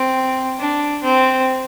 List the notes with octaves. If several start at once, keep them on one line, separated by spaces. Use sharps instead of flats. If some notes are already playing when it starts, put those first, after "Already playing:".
Already playing: C4
D4
C4